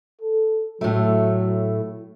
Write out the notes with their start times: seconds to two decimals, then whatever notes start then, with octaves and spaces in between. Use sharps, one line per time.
0.21 A4
0.81 A2 F#3 A3